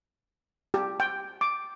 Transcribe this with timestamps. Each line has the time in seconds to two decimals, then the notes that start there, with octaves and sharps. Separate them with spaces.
0.74 G4
1.00 G5
1.41 D6